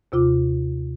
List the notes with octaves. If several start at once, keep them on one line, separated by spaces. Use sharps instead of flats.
D#2 C3 F4 D6